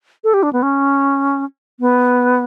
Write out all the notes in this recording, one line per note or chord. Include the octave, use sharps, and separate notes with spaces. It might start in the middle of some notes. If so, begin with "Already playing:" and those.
A4
G4
D4
B3
C#4
B3